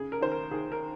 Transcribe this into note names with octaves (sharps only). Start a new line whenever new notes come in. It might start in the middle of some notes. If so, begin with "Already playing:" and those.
Already playing: C#3 G#4
A#4
D#2 C5
A#4
D#2 G#4
A#4